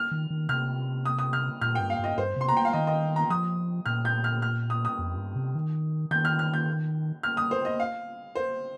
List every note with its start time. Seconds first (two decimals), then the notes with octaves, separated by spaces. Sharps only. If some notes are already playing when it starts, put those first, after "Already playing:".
Already playing: F6
0.11 D#3
0.30 D#3
0.49 C3 F6
1.05 D#6
1.19 D#6
1.33 F6
1.61 A#2 F6
1.75 G2 G5
1.90 F5
1.99 G2 D#5
2.18 G2 C5
2.36 C3 C6
2.48 A#5
2.57 G5
2.65 F5
2.73 D#3 D#5
2.87 D#5
3.16 A#5
3.30 F3 D#6
3.86 A#2 F6
4.05 G6
4.24 F6
4.42 F6
4.70 D#6
4.85 D#6
4.99 F2
5.17 G2
5.35 C3
5.55 D#3
6.11 D#3 G6
6.25 F6
6.39 F6
6.54 G6
7.23 F6
7.37 D#6
7.51 C5
7.65 D#5
7.80 F5
8.35 C5